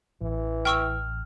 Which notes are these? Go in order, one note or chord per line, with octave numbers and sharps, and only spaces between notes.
A1 E3
G5 C#6 E6 F6